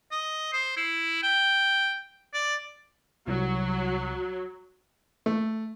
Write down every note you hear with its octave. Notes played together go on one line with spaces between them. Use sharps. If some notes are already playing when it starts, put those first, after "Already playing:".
D#5
C5
E4
G5
D5
C2 F#3
A3